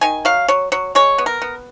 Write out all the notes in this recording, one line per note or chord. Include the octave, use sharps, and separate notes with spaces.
D#3 G#5
F#3 F5
F#3 C#5
F#3 C#5
G#3 C#5
B3
A#4
B3